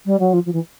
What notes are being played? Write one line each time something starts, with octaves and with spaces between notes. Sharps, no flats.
G3
F#3
F3
F3
E3